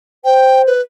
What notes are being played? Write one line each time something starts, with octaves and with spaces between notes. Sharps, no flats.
C5 G5
B4